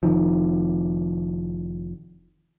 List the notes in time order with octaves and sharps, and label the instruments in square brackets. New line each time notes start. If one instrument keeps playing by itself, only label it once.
[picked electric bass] F1 D#3 F3